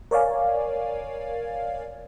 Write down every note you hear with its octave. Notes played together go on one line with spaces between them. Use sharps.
A#4 C#5 D5 F5 G#5